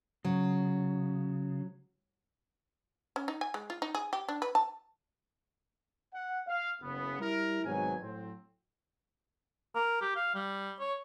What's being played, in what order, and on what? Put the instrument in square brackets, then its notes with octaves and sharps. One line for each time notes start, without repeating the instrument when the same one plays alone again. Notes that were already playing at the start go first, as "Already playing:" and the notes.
[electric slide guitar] C#3 [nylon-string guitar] F#3
[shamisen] C#4
D#4
G#5
G#3
F4
D#4
G#4
G4
D4
B4
A5
[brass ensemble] F#5
F5
F#1 C#3 B3
G3 E4 A#4
G#1 G#2 B2 F#3 G#5
A2 F#3 C4
[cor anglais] A#4
G4
F5
G3
C#5